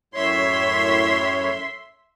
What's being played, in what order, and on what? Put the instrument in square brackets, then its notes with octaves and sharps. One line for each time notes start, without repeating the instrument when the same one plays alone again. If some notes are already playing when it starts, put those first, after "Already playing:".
[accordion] F#2 A2 C#5 [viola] E5 C6